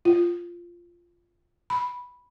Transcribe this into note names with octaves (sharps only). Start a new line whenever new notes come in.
F4
B5